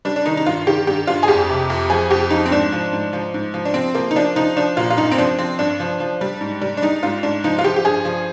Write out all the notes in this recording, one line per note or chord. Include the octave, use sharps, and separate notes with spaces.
G3 D4
D4
D#3 D#4
D#4
G2 F4
D#3 G4
G2 G4
G2 F4
G#4
F2 G4
C3
F2
F3 G#4
F2 G4
F3 D#4
C4
G#2 D4
F3
G#2
F3
G#2
F3
D4
F3 C4
F3 A#3
D#4
F3 D4
F3 D#4
F3 D4
A#2 F4
F4
G2 D#4
C4
F3 D4
F3 C4
G2 D4
F3
F3
G3
G#2
G3
D4
G3 D#4
G#2 F4
G#2 D4
F3 D#4
F4
F3 G4
G4
G2 G#4
F3